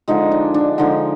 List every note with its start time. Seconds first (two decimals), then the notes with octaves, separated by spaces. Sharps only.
0.08 D3 F3 G#3 D#4
0.32 D4
0.54 D4
0.78 D3 F3 G#3 D#4